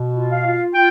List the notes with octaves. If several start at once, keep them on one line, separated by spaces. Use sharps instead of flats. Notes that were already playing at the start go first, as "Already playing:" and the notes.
Already playing: B2
F4
F5
F4
F4 G5